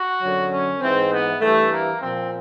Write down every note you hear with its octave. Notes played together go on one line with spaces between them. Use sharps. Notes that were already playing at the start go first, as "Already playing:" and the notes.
Already playing: F#4
F#2 D3 F#3
C#4
G#2 E3 C4
B3
G2 E3 A3
A#3
A#2 F3 C4